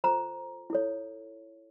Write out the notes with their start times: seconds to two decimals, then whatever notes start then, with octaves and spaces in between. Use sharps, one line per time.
0.04 F4 A4 C5 A#5
0.70 E4 A4 C#5